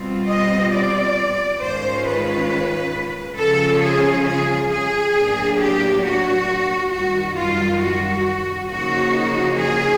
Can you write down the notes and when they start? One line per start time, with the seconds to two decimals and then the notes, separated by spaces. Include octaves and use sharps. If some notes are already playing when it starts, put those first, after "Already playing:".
Already playing: B2 G3 C4 F4
0.28 D#5
0.71 D5
1.60 G#2 D#3 G#3 C#4 F4 C5
2.05 B4
3.37 C#3 F3 G#3 C#4 F4 A4
3.82 G#4
4.26 G#4
4.69 G#4
5.15 A2 F#3 A#3 D4
5.59 G4
6.03 F#4
6.91 F#2 D#3 G3 F#4
7.36 F4
7.80 F#4
8.68 C#3 F3 A#3 D#4 F#4
9.56 G#4